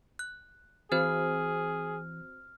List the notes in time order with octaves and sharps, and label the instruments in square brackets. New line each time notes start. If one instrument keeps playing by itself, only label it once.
[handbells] F#6
[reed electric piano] E3 [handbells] C4 F#4 C5 [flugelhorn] G#4 [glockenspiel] F6